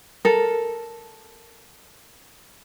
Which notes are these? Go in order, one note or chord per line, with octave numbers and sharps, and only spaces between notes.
A4 A#4